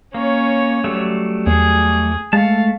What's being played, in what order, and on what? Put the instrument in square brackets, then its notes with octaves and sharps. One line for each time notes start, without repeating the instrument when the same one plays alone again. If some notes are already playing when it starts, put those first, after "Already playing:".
[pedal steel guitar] A#3 [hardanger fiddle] C#4 C#5
[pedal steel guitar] F#3 G3 A3
[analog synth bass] E2 [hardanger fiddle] G#4
[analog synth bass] G#3 [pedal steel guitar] A3 A5 [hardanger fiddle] F5